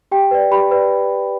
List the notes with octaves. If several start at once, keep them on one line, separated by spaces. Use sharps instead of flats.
G4 G5
B4 D5
G4 B5
B4 D5